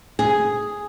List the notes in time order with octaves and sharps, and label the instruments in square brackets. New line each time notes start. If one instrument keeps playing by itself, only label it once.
[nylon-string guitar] G#4